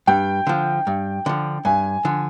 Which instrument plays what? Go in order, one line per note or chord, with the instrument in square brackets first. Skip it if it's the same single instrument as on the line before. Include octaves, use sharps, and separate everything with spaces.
[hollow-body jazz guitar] G2 [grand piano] G5
[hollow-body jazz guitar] D3 F3
G2
D3 F3
[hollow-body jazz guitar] G2 [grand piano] G#5
[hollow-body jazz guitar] D3 F3